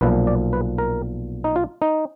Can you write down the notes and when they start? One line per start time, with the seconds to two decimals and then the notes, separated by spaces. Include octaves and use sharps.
0.01 B1 A#2 F3 B4
0.27 D5
0.53 B4
0.78 A#4
1.44 D#4
1.56 F4
1.82 D#4